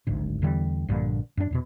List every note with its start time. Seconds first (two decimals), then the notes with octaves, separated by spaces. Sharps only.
0.07 D1 G#1 D2 G#2
0.42 E2 D3 E3 G3
0.88 A#1 G2 A#2 D3
1.37 F#2 D4
1.51 E2 G#2 B2